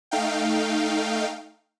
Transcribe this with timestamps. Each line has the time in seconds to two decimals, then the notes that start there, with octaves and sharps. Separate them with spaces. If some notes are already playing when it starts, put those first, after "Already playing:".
0.11 A3 D#4 F5 G5